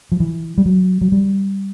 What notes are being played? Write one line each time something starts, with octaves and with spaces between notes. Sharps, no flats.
F3
E3
G3
F#3
F#3
G3